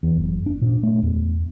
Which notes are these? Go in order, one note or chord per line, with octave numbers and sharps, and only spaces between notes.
E2
F#1
D4
A#2
A3
E2